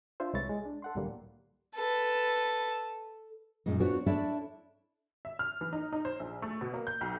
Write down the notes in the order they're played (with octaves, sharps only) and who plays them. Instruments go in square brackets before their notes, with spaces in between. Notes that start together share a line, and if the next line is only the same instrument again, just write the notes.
[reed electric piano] D4 F4 C5 E5
C2 G#3 E4 C#5 A6
G#3
D4
A4 F#5 C6
C2 A2 D3 F#3 G3 A#3
[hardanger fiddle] A4 B4
[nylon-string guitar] F#2 A#2 G#3 D#4
B3 C4 D4 F4 F#4 C#5
D4 E4 A4 C#5 D5 E5
[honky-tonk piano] E5
F6
E3
D#4
D#4
C5
A#1
A3
B2
A#3
G6
B1